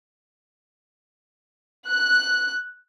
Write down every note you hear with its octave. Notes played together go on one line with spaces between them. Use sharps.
F#6